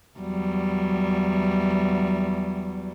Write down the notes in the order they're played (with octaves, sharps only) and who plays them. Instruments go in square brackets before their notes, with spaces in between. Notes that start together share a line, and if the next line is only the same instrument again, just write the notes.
[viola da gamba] E2 F#3 G3